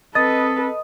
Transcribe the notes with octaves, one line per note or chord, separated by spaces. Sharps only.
C4 A4 B4 D#5 D#6 A6